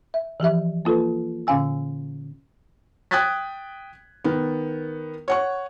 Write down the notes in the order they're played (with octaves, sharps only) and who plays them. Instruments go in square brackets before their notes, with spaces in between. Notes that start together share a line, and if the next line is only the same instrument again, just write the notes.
[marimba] E5
E3 F3 G4 E5
A#3 F4 A4 B4
A#2 D3 C#4 F5 G#5 E6
[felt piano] G5 D#6 F#6 G#6 A6 B6
D#3 B3
C#5 F#5 C#6